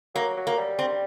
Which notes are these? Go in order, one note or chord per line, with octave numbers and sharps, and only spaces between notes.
F#3 A#3
F#3
A#3
G3
C4